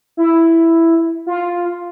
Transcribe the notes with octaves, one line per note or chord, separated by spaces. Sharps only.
E4
F4